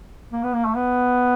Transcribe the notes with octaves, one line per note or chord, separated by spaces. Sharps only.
A#3
B3
A#3
A3
B3